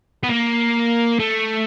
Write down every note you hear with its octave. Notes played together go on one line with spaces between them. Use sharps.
B3
A#3
A3